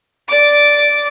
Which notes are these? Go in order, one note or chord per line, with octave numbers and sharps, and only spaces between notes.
D5 D6